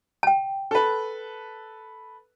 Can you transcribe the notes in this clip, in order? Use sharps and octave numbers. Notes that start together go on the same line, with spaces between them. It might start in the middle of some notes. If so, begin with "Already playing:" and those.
G5 A5
A4 B4